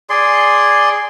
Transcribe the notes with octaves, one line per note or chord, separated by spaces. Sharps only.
G#4 D5 C6